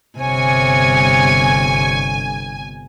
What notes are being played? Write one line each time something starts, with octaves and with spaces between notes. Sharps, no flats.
G1 C3 C#5 G#5